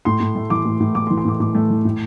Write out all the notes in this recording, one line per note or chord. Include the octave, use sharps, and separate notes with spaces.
A2 C6
A2
A3
E3 D6
A2
A2
A3 D6
C6
E3
C6
A2 D6
A2 D6
A3
E3
A2